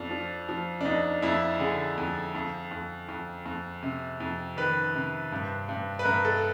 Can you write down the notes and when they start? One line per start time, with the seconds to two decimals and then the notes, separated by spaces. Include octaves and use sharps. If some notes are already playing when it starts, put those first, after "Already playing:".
Already playing: F2 F3 D4
0.11 F3
0.49 F3
0.81 D4
0.85 F2 D#4
1.22 F2 E4
1.60 D3 G#4
1.98 F2
2.35 F2
2.71 F2
3.09 F2
3.46 F2
3.83 C3
4.20 F2
4.57 D#3 B4
4.94 C3
5.32 G2
5.69 G2
5.99 B4
6.05 G2 A#4
6.25 A4